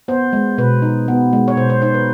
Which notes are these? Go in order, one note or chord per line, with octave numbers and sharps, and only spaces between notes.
B3 C5
G#3
B2 B4
D#4
B3
G#3
C#5
B2 C5
C5
D#4 C5
B4